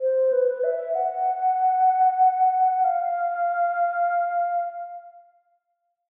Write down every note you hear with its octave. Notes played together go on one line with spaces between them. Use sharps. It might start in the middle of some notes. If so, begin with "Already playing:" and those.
C5
B4
E5
F#5
F5